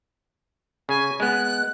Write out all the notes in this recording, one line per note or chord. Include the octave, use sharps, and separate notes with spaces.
C#3 G#5
G#3 B3 F#6